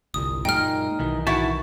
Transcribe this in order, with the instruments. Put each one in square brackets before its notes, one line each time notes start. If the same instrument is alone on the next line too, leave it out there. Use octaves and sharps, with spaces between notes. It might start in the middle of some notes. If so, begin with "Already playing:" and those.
[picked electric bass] G1 C2 [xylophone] D#6
[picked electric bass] F#2 A#2 G#3 [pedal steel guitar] D#4 [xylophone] G5 F6
[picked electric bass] B1 D#3 E3
[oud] E4 F#4 [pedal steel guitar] A5